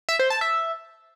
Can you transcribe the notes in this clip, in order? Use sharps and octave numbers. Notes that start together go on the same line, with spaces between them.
E5
C5
A5
E5